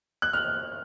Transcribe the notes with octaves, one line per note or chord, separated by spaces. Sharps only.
F#6
F6